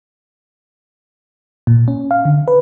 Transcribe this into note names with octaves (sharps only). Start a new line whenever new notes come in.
A#2
C#4
F5
D3
B4